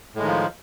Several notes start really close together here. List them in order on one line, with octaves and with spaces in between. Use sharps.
A2 G#3 D#3 F3